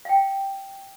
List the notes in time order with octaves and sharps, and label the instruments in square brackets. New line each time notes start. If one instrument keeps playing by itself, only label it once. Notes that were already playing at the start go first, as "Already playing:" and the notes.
[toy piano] F5 G5